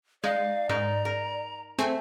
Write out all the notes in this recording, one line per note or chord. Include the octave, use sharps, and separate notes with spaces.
G#3 D#4 D5 F5
G#2 D#4 A#4 A#5
A#4
A3 C4 G#5